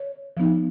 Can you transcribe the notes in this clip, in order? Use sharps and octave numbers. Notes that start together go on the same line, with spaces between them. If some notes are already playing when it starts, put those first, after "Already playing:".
Already playing: C#5
F3 B3 D#4